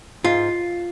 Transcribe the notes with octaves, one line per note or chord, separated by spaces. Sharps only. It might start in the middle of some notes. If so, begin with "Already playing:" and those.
G#2 F4